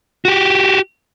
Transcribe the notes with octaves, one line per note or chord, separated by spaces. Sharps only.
F#4 G4